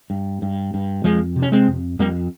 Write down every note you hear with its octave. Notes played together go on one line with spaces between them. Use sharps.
G2
G2
G2
F2 F3 G#3
C3
C#4
G#3 C4
F2
F2 G3 A#3